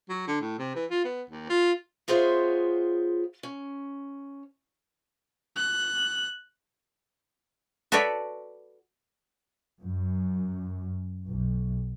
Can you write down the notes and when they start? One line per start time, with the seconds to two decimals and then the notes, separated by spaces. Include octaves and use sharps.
0.09 F#3
0.28 D3
0.41 A2
0.59 C3
0.75 E3
0.91 F4
1.05 B3
1.30 D#2
1.50 F4
2.08 B3 F4 G#4 C5 C#5 E5
3.43 C#4
5.56 F#6
7.92 F#4 A4 B4 C#5 D5 E5
9.82 F#2
11.27 B1